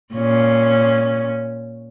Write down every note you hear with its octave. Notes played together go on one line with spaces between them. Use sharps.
A#2 C#4